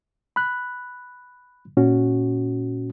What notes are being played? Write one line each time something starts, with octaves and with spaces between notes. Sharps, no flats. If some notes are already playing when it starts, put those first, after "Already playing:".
B5 F#6
A#2 C#4 F#4